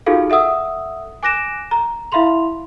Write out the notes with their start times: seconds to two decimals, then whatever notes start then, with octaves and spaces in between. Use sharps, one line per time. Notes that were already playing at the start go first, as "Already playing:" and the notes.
0.06 D#4 F4 F#4 G#4 A4 F5
0.30 A4 E5 F#5 D#6 E6
1.23 G#5 D6 F#6 A#6 D7 E7
1.71 A#5
2.12 E4 E5 F5 B5 C6 F7